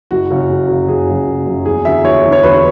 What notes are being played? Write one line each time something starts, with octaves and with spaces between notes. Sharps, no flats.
F#1 F#4
F#2 C#3 F#3
F#1
F#2 C#3 F#3
F#1 G#4
F#2 C#3 F#3
F#1
F#2 C#3 F#3
E2 G#4
D3 F#3 E5
E2 C#5
D3 F#3
C#5
E2 B4
B4